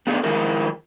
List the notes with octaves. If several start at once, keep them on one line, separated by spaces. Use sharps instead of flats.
A3 B3 D4 D#4 G4 G#4
D#3 F3 G#3 E4 A#4